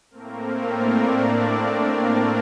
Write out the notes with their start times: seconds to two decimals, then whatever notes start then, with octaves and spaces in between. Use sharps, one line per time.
0.10 A2 A3 A#3 C4 A#4
0.71 D4 D5
1.94 A#3 A#4